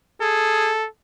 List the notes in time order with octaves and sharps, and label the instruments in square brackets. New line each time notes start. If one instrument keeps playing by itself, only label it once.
[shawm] G#4 [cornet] A4